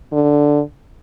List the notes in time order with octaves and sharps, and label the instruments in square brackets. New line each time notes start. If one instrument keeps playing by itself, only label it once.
[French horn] D3